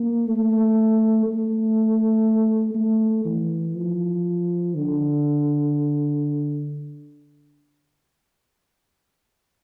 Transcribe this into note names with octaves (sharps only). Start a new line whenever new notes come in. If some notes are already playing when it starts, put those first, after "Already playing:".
Already playing: A#3
A3
A3
A3
E3
F3
D3